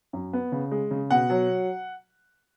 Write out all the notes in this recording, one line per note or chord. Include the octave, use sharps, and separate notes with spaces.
F#2
B3
C#3
G#3
C#3
B2 F#5
F#3